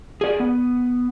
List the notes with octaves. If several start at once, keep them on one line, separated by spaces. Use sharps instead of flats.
G#4 D5
B3